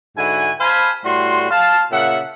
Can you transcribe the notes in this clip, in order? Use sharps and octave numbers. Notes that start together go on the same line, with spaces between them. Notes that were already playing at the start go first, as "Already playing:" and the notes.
G#2 D3 E4 F#4 F#5 G#5
C5 F5 G#5 A5 B5
A2 G3 F#4 C6
F5 A5
A#2 C#3 E5 F#5